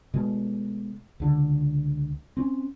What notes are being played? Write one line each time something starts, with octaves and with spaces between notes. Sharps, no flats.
B2 G#3 A3
C#2 D3
C4 C#4